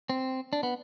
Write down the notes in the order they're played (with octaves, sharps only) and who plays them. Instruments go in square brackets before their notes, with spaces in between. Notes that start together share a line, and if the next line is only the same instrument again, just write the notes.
[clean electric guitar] C4
D4
B3